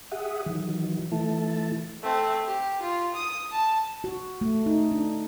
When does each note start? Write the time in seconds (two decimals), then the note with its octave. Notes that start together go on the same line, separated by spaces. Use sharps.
0.11 G4 G#4 E5 F#5 D#6
0.46 D#3 E3 F#3
1.12 E3 A3 E4 A5
2.03 A3 C4
2.46 G4
2.82 F4
3.15 D#6
3.52 A5
4.04 F#4
4.41 A3
4.66 D#4
4.92 D4